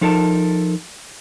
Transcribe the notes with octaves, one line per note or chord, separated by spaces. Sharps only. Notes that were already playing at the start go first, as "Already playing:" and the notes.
F3 D#4 A4 A#4 A5